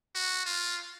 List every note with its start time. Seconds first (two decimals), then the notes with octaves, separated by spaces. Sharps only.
0.15 F#4
0.46 F4